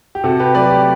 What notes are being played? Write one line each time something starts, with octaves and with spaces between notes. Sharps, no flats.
G4
C3 F#4 A4
G4 B4
F#3 A3 B4 D5
G4